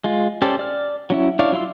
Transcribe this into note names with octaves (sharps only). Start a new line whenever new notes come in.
G#3 F4
C#4 G4 A4 C5 D5
D5 F6
F#3 C#4 E4
D4 E4 C#5 D5 F5
F#3 E4 F4 C6 E6